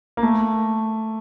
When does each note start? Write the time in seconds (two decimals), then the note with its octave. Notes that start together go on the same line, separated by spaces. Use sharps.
0.17 A#3
0.23 A3